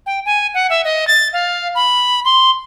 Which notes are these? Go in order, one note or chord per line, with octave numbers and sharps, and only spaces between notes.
G5
G#5
F#5
E5
D#5
A6
F5
B5
C6